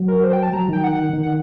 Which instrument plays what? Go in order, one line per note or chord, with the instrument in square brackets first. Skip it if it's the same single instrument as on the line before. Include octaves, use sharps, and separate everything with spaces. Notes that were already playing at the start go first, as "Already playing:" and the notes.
Already playing: [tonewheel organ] F#3
[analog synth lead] A#4
C5
G5
A5
[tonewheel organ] F#3 [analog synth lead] A#5
[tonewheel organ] D#3 [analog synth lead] G5
[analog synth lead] F#5
[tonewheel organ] D#3
[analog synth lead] F#5